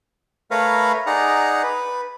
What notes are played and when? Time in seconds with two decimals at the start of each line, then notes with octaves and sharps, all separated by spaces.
0.51 A3 A#4 B4 C#5 F5 B5
1.06 D#4 G#4 D5 F#5 A#5
1.63 B4